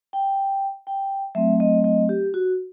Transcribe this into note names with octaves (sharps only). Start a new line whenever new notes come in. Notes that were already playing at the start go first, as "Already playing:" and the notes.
G5
G5
F#3 A3 C4 E5
D#5
D#5
G4
F#4